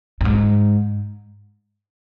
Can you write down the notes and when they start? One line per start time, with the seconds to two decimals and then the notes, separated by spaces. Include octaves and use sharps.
0.21 G2
0.25 G#2